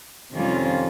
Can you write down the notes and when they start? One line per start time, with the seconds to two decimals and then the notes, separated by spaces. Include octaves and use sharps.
0.32 F2 C3 D#3 G3 C#4 F4